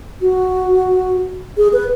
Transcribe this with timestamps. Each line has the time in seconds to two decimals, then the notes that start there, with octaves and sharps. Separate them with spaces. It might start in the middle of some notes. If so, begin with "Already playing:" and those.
0.22 F#4
1.58 G#4
1.73 B4